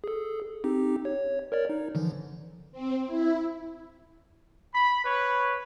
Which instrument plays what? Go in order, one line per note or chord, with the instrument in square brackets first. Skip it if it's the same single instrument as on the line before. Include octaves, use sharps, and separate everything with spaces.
[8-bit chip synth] G#4 A4
C4 D#4 G4
C#5
A#4 C#5 D5
D#4
D3 E3 F3
[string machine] C4
E4
[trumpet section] B5
B4 C#5